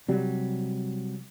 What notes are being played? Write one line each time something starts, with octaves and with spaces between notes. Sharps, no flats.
C3 F#3 G3